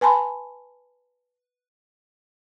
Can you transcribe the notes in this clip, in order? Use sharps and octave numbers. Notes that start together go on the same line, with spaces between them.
B4 G#5 A5 B5 C6